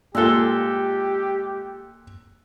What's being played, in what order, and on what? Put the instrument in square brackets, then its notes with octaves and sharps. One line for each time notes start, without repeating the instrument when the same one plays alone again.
[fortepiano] A#2 A4 [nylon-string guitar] G#3 F4 [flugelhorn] G4 [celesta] E6 F#6 G7